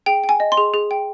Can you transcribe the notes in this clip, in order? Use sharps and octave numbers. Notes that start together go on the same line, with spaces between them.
G#4 G5
G5
G#5
D#5
C6
G#4
G#4
G5